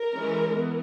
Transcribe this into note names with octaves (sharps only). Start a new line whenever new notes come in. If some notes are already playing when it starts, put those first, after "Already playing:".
Already playing: A#4
E3 G#3 C#4
E3 B3